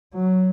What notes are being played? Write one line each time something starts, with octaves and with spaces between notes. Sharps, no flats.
F#3